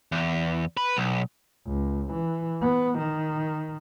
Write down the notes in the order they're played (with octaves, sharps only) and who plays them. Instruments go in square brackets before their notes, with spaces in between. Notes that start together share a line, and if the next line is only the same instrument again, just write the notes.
[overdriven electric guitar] E2
B4
B1
[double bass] C#2
E3
B3
D#3